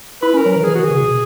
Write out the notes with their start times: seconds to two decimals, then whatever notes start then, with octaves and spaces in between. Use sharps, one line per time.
0.22 E4 B4
0.34 C#4 A#4
0.45 F#3
0.52 E3 A#4
0.64 E3 G#4
0.75 D#3 F#4
0.84 G#4
0.90 C#3
1.02 B2